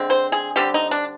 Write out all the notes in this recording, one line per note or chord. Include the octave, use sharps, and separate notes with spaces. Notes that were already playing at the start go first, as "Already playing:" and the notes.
Already playing: D3 G#3 C4
C5
G#4
D3 G3 C4 G4
D#4
D4